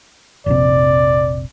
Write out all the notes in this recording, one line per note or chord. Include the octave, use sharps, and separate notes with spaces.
F1 A#1 C3 D5